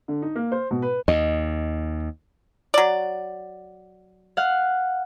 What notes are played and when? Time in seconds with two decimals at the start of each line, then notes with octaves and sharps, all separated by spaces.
0.08 D3
0.22 D#4
0.36 A#3
0.52 C5
0.71 B2
0.82 B4
1.08 D#2 D#5
2.74 F#3 D5
4.37 F5 F#5